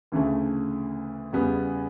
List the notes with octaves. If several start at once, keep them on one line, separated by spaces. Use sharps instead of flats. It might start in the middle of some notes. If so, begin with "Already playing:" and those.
D2 C#3 E3 A3
E2 C#3 G3 B3